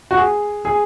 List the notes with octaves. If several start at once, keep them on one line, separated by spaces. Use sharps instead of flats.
F#4
G#4
G#4